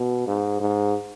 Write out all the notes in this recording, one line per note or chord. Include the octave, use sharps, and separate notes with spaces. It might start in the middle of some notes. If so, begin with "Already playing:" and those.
Already playing: B2
G#2
G#2